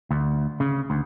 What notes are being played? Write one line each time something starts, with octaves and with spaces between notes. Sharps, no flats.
D2
C#3
D2